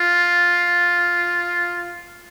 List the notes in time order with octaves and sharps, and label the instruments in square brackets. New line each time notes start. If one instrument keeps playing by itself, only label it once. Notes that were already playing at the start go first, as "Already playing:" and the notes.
Already playing: [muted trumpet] F4